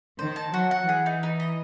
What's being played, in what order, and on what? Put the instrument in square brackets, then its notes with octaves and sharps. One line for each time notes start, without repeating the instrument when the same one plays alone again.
[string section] D#3 [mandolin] C5
[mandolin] A5
[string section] F#3 [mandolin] F#4
[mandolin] F#5
[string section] E3 [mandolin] G#4
[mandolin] D#4
D#4
D#5